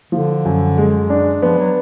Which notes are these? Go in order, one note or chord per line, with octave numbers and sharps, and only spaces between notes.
D3 F3
F#2
G#3
D4
F3 B3
F#3